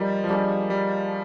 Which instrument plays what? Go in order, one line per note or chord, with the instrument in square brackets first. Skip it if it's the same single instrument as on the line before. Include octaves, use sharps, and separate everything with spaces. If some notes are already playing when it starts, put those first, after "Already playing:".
Already playing: [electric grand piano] F3 G3 [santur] D#4 A#4
[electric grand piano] F3
[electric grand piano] G3 [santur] A#3 D4 G#4 D#5
[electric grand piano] G3